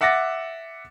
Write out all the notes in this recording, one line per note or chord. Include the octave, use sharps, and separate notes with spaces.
E5 F#5 D6 A6 A#6